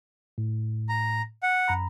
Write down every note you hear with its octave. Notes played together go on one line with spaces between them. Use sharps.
A2
A#5
F#5
F#2 A#5 B5